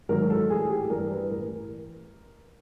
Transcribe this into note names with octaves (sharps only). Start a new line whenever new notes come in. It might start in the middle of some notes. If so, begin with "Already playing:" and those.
G#2 D#3 F#3 A#4
A4
A1 G#4
G4
G2 E3 G3 A#4
B4
A1 A#4